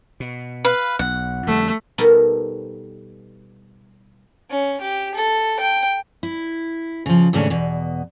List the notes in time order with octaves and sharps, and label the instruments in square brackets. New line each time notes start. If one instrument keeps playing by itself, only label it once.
[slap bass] B2
[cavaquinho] B4 F5
[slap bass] B1 [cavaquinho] F#5
[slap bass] F2 D3 G3 [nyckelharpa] A3
[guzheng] B2 G3 B3 D#4 A4 A#4
[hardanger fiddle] C#4
G4
A4
G5
[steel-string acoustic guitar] E4
C#3 F3
D#2 G#2 C#3 A3 C#4 D4
E2 B2